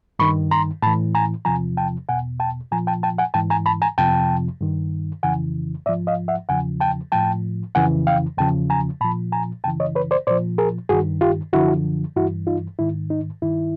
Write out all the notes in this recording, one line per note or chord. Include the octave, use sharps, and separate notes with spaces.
G2 D#3 B5 C#6
A#5 C6
A2 E3 A5 B5
G#5 A#5
E2 C3 F3 G#5 A#5
G5 A5
E2 B2 F#5 G#5
G5 A5
A#2 F3 G#5 A#5
G5 A5
G5 A5
F#5 G#5
G#2 E3 G5 A5
G#5 A#5
A5 B5
G#5 A#5
F2 C3 F3 G5 A5
G2 D#3
F2 C#3 E3 F#5 G#5
G#2 F3 D5 E5
D#5 F5
E5 F#5
E2 C#3 F3 F#5 G#5
G5 A5
A2 F3 G5 A5
F2 C#3 E3 F#5 G#5
F5 G5
E2 C#3 F3 G5 A5
G#5 A#5
A#2 F3 A5 B5
G#5 A#5
F#2 C#3 E3 G5 A5
C#5 D#5
B4 C#5
C5 D5
A#2 F3 C5 D5
G#4 A#4
G2 D#3 F#4 G#4
F4 G4
F#2 D3 F3 E4 F#4
G2 E3 E4 F#4
D#4 F4
G#2 D#3 E4
D#4
G2 D#3 E4